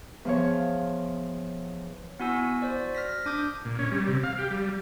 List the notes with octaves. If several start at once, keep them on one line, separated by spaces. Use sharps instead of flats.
E2 F3 C#5
B3 E4 F#4 G#5 E6
F#4 C5 D5
F6 A#6 B6
D4 D6 D#6 G6
A#2
C#4
G3
C3
F5
G4
G3